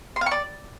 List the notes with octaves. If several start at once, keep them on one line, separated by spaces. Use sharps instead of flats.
C6
F5
C#6
D5